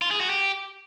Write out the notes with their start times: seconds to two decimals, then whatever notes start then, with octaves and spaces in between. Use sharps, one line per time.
0.02 F4
0.11 G#4
0.20 F#4
0.30 G4